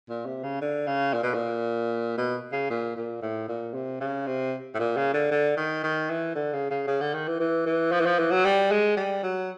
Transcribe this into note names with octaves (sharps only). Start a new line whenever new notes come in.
A#2
C3
C#3
D3
C#3
A#2
B2
A#2
B2
C#3
A#2
A#2
A2
A#2
C3
C#3
C3
A2
A#2
C#3
D3
D3
D#3
D#3
E3
D3
C#3
C#3
C#3
D3
D#3
E3
E3
E3
F3
E3
F3
E3
F#3
G3
G#3
G3
F#3